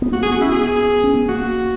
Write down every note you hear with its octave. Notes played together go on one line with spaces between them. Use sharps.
B3
A#3 F#4
G#4
B3
F#4
C#4 E4
B3 G#4
C#4
B3
A#3 F#4